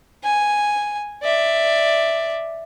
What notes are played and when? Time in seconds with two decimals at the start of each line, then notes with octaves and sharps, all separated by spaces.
0.24 G#5
1.23 D5 E5